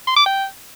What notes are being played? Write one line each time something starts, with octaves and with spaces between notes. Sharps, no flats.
C6
D6
G5